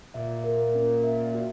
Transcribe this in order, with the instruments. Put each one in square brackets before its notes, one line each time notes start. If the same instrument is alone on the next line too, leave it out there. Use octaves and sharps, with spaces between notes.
[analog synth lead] A#2 [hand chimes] E5
[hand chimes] A#4
C#4
E5
F#4